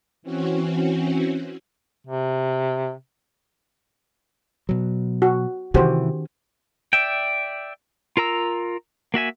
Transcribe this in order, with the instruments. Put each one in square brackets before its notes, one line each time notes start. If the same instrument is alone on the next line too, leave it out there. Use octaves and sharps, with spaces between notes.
[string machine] E3 C4 C#4 F#4
[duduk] C3
[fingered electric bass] B2 F#3
[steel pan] F#4
[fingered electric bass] C3 E3 [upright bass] D#3 C#4 [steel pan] F#4 G4 C5
[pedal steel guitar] D5 E5 G5
F4 A#4 A#5 E6
A#3 F#4 E5 G#5